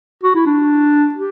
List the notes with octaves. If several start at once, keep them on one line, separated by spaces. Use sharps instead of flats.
F#4
E4
D4
G4